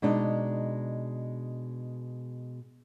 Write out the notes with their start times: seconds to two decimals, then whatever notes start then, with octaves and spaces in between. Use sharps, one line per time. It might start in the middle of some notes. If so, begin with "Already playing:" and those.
0.02 B2 G#3 D4 D#4